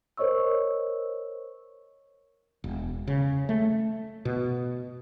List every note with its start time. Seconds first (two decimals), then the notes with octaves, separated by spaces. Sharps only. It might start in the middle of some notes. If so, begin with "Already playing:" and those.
0.17 A#4 C5 C#5 D#5 C#6 E6
2.64 E1
3.07 C#3
3.49 A3
4.25 B2